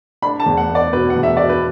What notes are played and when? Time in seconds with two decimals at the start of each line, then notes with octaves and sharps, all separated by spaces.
0.22 D4 B5
0.40 A5
0.46 E2
0.57 F#5
0.69 B3
0.75 D5
0.93 B2 B4
1.10 F#5
1.16 E2
1.23 E5
1.37 B2 D5
1.49 B4